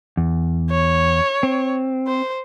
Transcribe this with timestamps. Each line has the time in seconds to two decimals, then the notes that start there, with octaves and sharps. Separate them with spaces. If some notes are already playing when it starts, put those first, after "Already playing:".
0.17 E2
0.71 C#5
1.43 C4
2.07 C5